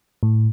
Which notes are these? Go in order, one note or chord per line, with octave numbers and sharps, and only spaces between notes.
A2